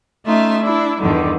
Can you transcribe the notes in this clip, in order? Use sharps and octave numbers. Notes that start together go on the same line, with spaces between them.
A3 C#4 D#4 F4 E5
D4 E4
E2 G2 D3 D#3 G3